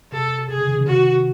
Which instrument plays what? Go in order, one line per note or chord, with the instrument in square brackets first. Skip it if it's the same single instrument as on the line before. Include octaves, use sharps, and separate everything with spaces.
[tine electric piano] C3 [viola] A4
[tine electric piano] C3 [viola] G#4
[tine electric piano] C#3
C3 D#3
C#3 E3
[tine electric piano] C3 D#3 [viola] F#4